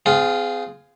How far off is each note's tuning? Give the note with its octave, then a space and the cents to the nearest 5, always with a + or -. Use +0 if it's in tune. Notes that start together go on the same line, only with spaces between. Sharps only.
C4 -40 F4 +0 G#4 +0